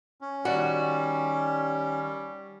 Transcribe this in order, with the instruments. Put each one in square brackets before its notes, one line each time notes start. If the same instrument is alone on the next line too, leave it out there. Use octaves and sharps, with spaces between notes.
[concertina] C#4
[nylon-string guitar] D#3 D5 [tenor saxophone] G3 [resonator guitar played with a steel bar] F#4